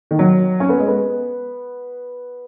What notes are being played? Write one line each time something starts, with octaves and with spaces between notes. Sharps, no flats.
D#3
F#3
C#4
B3
G#3
B3